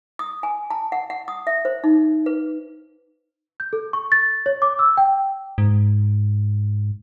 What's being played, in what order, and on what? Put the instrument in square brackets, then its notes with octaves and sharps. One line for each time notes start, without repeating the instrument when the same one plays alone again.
[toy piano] D#6
G#5
A5
F#5
F#5
D#6
E5
C5
D#4
B4
[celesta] G6
A4
C#6
A6
C#5
D6
E6
G5
[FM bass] G#2